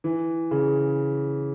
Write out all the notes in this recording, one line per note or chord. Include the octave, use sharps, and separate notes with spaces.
E3
C#3